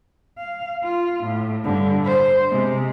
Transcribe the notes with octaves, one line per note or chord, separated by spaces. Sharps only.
F5
F4
A2
G2 D3
C5
C3 G#3